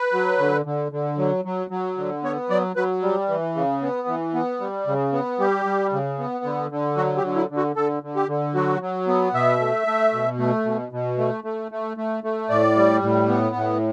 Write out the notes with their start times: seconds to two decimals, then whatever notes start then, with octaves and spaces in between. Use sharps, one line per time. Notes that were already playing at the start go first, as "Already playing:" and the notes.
Already playing: B4
0.13 F#3
0.39 D3
0.66 D3
0.92 D3
1.18 F#3
1.45 F#3
1.70 F#3
1.97 D3
2.24 B3 C#5
2.50 F#3 D5
2.76 F#3 B4
3.02 G3
3.29 E3
3.55 C#3
3.82 B3
4.08 E3
4.34 B3
4.60 G3
4.87 C#3
5.13 B3
5.39 G3 G4
5.65 G3
5.92 C#3
6.19 B3
6.44 D3
6.71 D3
6.97 F#3 F#4
7.17 G4
7.24 D3
7.36 E4
7.50 D3
7.57 F#4
7.76 D3 A4
8.03 D3
8.15 G4
8.28 D3
8.55 F#3 F#4
8.81 F#3
9.08 B3
9.34 B2 E5
9.60 A3
9.87 A3
10.13 B2
10.39 A3
10.65 B2
10.92 B2
11.18 A3
11.44 A3
11.72 A3
11.97 A3
12.24 A3
12.50 A2 D5
12.76 G3
13.02 A2
13.28 B3
13.55 A2